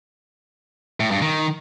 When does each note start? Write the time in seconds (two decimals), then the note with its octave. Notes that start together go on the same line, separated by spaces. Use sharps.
1.00 A2
1.11 G2
1.22 D#3